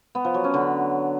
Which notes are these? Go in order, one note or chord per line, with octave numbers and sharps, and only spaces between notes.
B3
F3
F#3
C#4
D3